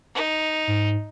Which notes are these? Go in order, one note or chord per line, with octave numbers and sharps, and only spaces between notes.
D#4
G#2